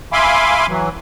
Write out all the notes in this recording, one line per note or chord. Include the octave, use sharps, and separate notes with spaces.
E5 F5 G#5 B5 C6 D6
E3 F#3